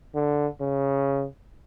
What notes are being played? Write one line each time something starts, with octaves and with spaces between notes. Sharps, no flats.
D3
C#3